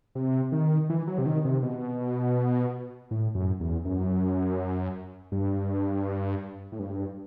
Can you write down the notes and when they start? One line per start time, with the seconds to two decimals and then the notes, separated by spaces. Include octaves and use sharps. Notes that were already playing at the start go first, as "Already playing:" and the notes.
0.15 C3
0.52 D#3
0.90 E3
1.07 F#3
1.18 C3
1.26 D#3
1.45 C3
1.63 B2
3.11 A2
3.35 F#2
3.60 E2
3.85 F#2
5.32 G2
6.72 A2
6.80 G2